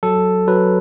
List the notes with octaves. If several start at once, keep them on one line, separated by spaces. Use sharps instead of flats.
F#3 A4
F#3 B4